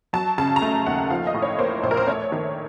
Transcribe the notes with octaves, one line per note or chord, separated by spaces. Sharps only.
F#3 A5
C#3 A5
A#5
A3 A5
D#2 F#5
F3 F5
D#5
A2
C#5
A#3 C5
A#1 C5
A#4
C5
A3 C#5
D#3